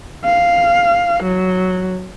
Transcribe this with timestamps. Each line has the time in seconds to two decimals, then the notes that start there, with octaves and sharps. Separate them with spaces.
0.25 F5
1.23 F#3